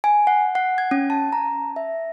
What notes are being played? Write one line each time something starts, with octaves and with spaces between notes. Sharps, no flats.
G#5
F#5
F#5
G#6
C#4
A5
A#5
E5